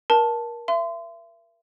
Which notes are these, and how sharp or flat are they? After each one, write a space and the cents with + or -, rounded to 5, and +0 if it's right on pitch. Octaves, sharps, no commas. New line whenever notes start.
A#4 +25 A5 +0
E5 +35 C6 -25